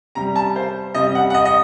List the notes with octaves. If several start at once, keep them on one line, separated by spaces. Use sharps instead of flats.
C3 G3 A#5
A5
C5
C3 G3 D#5
F#5
F#5
D#5
D#5